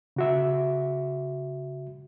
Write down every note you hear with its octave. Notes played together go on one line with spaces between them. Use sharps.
C#3 F#4 E5